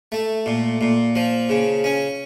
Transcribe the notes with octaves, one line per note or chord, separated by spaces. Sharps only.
A3
A#2
A#2
F3
C#3
C#4